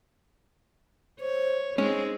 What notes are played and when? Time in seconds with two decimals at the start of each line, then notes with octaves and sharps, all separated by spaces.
1.21 C5 C#5
1.78 G#3 C4 C#4 D#4